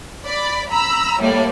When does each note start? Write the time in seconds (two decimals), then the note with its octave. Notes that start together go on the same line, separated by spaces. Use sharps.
0.26 D5 B5
0.70 A#5 B5 E6
1.20 A2 G3 A#3 D5